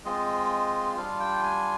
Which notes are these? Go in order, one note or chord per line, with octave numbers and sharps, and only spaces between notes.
G#3 C4 F4 D#5
G3 D4 F4 F5
G5
G#5